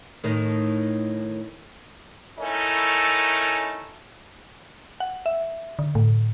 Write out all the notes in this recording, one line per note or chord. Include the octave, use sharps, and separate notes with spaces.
A2 D#3
A3 C#4 D#4 E4 A4 A#4
F#5
E5
D3
A2